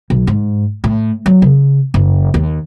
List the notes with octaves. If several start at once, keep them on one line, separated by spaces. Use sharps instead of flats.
B1
G#2
A2
F#3
C#3
F#1
D#2